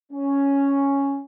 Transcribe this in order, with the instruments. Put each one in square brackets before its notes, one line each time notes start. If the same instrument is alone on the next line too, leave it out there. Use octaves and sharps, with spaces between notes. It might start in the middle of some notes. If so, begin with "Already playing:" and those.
[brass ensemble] C#4